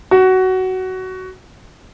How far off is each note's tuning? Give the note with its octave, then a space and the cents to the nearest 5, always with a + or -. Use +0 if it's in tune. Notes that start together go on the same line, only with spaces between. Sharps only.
F#4 +15